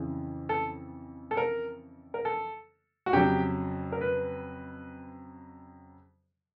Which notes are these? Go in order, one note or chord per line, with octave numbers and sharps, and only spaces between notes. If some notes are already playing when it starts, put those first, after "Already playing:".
Already playing: F2 C#3 E3
A4
A4
A#4
A#4
A4
F#4
F2 C#3 F#3 G4
A#4
B4